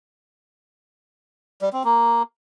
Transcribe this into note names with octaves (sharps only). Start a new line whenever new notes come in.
G3
C4
A#3